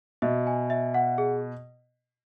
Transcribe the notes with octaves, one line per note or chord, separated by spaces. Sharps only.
B2 E5
G#5
E5
F#5
G#4